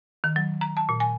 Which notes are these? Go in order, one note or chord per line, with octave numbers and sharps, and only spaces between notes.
D#3
F#3
A#5
A5
A#2
G#5